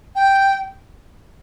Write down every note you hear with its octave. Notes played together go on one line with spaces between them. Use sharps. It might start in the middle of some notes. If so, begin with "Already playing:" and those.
G5